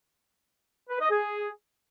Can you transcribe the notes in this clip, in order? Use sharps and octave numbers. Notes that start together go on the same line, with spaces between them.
B4
D#5
G#4